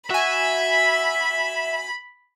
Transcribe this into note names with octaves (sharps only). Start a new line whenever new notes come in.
F#4 E5 G#5 B5